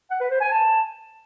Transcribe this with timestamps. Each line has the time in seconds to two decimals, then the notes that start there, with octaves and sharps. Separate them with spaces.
0.10 F#5
0.21 B4
0.31 C5
0.41 G#5
0.51 A5